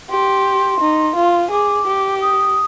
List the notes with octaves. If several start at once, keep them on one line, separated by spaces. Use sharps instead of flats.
G4 C6
D#4
F4
G#4 D6
G4
D#6